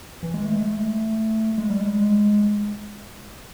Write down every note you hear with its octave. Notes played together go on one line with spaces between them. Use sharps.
E3
G#3
A3
G#3
A3
G#3
G3
G#3